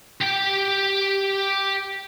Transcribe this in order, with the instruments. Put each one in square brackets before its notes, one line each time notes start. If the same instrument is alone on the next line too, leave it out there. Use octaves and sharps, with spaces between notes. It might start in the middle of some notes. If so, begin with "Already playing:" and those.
[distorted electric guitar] G4 G5